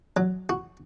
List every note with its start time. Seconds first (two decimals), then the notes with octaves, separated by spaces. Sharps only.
0.17 F#3
0.49 F#4